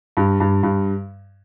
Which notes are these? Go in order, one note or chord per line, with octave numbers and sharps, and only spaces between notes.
G2
G2
G2